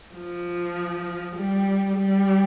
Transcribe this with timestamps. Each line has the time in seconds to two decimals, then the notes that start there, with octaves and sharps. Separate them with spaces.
0.15 F3
1.37 G3
1.97 G3